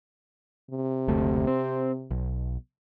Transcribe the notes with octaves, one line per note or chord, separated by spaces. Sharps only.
C3
F#1 D2 A3
C4
B1